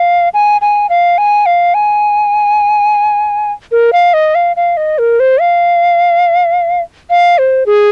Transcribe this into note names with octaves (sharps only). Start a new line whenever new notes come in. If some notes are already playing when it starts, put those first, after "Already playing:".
Already playing: F5
G#5
G#5
F5
G#5
F5
G#5
A#4
F5
D#5
F5
F5
D#5
A#4
C5
F5
F5
C5
G#4